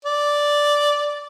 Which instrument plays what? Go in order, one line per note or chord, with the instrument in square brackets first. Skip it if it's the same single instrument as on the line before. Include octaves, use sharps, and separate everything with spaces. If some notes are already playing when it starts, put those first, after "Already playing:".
[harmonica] D5